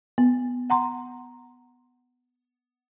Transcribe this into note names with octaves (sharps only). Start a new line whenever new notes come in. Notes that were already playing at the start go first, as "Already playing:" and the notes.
B3
F#5 A#5 C6